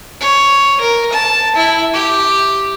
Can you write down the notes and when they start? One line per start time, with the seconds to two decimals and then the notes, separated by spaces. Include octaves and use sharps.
0.21 C#5
0.81 A#4
1.13 A5
1.56 E4
1.94 G4